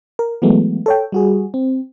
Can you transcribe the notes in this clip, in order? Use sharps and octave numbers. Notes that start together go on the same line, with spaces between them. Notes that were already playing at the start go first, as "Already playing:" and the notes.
A#4
E3 F#3 G#3 A3 B3
A4 C#5 G5
G3 F#4 G#4
C4